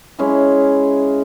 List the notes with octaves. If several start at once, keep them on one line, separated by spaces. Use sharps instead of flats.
G#3 C#4 E4